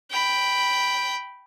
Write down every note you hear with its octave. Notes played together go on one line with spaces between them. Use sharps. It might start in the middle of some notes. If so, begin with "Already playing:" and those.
G5 B5